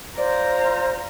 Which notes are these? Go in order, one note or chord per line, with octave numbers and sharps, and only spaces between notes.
F4 C5 D5 A#5